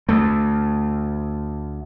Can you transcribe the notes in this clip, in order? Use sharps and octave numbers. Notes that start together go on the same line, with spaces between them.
D2 A3